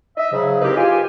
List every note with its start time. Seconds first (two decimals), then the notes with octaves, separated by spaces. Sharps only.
0.17 D#5 E5
0.32 G#2 C#3 F#3
0.61 C4 D#4 E4 G4 A#4 B4
0.77 F4 G4 G#5